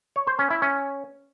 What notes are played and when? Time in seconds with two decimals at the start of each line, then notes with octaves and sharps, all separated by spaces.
0.16 C#5
0.27 C5
0.39 C#4
0.50 E4
0.62 C#4